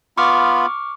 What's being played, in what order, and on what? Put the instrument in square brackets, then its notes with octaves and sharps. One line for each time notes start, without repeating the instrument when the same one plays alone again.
[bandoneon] B3 F4 B5 [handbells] C#6 D6 F6